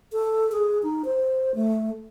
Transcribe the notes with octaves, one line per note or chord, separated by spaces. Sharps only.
A4
G#4
D#4
C5
A3